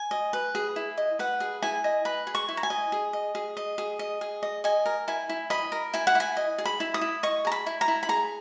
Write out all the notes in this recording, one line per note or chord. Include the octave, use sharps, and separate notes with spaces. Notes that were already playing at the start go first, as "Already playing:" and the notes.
Already playing: G#5
D#5
B4
G#4
E4
D#5
B4 F#5
G#4
E4 G#5
D#5
B4 B5
G#4
C#6
E4
A#5
G#5
D#5
G#4
D#5
G#4
D#5
G#4
D#5
G#4
D#5
D#5 G#5
A#4
E4 G#5
E4
D#5 B5
A#4
E4 G#5
F#5
E4 G#5
D#5
G#4
B5
E4
D#6
E4
D#5 C#6
G#4 A#5
B5
E4
A#5
E4
B5
G#4 A#5